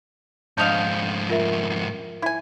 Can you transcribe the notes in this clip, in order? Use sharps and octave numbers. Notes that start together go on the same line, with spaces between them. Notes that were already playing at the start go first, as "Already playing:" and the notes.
F2 G#2 D4 D#5 F5 G6 F7
F4 A#4 E5
E4 G#5